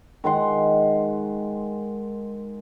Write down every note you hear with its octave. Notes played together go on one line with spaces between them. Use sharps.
D#3 G#3 F#5 C6